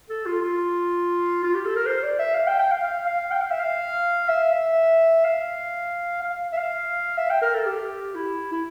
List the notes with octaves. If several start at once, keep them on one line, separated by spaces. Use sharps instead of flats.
A4
F4
F4
F4
G4
A4
A#4
C5
D5
E5
F5
G5
G5
F5
F5
F5
G5
F5
E5
F5
E5
E5
F5
F5
E5
F5
E5
G5
A#4
A4
G4
E4
E4